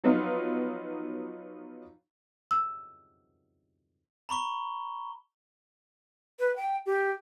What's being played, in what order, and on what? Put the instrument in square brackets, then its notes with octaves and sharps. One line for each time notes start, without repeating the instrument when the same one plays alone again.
[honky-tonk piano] F3 F#3 B3 D#4 F4
[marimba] E6
[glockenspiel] A#5 B5 C#6 G7
[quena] B4
G5
G4